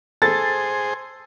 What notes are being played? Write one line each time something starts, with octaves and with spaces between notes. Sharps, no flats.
G#4 A4 C5 A6